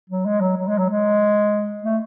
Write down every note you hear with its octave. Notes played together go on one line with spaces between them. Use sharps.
F#3
G#3
F#3
F#3
G#3
F#3
G#3
A3